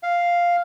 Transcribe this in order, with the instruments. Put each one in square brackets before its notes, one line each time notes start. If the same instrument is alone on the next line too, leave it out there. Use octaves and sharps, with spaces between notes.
[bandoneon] F5